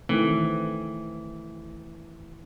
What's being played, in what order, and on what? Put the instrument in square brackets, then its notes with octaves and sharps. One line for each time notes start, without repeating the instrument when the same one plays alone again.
[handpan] D#3 A3 C4 [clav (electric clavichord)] E3